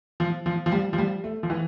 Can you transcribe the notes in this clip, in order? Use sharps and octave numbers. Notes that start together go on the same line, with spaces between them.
F3
F3
F3
G3
F3
G3
A3
F3
E3